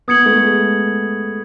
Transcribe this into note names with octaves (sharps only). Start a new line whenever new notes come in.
B3 D#6 G#6 C#7 F#7
A3
G#3